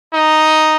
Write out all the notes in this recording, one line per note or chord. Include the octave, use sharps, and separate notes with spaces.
D#4